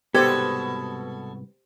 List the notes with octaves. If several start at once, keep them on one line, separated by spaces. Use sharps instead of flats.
C2 G#2 B2 B3 G4 A4 C5 G#6